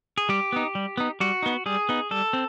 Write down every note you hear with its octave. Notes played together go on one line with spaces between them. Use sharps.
G#4
G3 G4
B3 D#4
G3
B3 D#4
G3 F#4
B3 D#4
G3 G#4
B3 D#4
G3 A4
C4